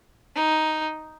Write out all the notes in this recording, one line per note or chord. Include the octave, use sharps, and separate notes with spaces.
D#4